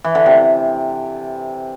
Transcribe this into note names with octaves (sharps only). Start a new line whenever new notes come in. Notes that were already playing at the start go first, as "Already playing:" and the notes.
E3
D3
C3